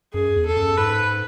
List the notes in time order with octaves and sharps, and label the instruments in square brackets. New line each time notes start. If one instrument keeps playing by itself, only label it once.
[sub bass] F#2 [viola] G#4
[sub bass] E2
[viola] A4
[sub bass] F#2
[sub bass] G#2 [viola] B4